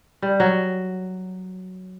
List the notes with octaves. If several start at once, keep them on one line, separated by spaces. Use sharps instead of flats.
G3
F#3